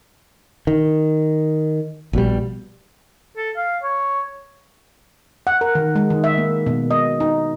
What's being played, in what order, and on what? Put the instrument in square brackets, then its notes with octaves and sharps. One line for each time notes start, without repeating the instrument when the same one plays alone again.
[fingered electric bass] D#3
A#1 B2 G3
[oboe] A4
F5
C#5
[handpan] F#5
A#4
D#3
G#3
D#3
E5
A#3
B2
D#5
D#4